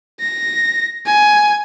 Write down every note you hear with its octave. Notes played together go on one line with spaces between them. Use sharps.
A#6
G#5